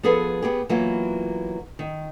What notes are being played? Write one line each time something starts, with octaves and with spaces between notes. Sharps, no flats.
F3 B3 G#4 A4 B4
B3 G4 G#4
E3 F#3 A#3 B3 F4
D#3